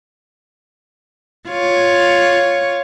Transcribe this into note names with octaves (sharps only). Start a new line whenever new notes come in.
F4 C#5